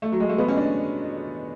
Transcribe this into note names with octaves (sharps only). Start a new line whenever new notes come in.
A3
F#3
G#3
A3
B3
C#4
D4